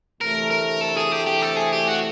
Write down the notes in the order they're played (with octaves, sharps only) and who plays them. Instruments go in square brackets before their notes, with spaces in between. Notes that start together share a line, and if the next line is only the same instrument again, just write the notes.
[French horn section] D2 C3 E3 A3 [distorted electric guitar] A#4
[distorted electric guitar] A#4
A4
G#4
G4
G4
A4
G#4
G4
F#4